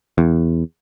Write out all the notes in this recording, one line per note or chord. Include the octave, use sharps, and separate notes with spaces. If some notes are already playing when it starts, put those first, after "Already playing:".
E2